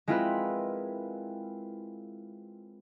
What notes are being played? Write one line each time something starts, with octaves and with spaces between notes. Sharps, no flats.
G#3 C4 E4 F4 A#4 B4